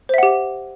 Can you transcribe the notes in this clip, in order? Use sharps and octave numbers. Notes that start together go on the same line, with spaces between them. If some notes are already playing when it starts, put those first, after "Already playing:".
G4 C5 E5 F#5